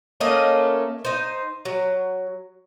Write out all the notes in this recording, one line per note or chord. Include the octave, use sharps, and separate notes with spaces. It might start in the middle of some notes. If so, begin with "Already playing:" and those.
A3 A#3 C#4 D#5
D#4 C5
F#3